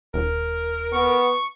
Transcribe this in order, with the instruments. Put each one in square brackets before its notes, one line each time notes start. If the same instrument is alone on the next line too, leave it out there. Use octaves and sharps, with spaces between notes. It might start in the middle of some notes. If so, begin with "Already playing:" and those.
[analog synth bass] D#1 [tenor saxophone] A#4
[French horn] B3 [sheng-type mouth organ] C#6